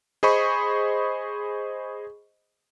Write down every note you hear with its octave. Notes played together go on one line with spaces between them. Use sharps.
G#4 C5 D#5 B5 C#6